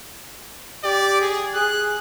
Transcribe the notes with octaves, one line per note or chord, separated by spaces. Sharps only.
G4 D5
G#4
G#4 F#6